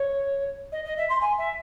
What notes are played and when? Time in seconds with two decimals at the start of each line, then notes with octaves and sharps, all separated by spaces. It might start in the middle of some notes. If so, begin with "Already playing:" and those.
Already playing: C#5
0.72 D#5
0.85 D#5
0.97 E5
1.09 C6
1.21 G#5
1.38 E5